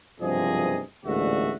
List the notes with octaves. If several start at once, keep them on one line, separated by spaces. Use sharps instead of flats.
F#1 G2 C3 F3 G#4 D#5
A1 D2 A#2 G#3 F#4 E5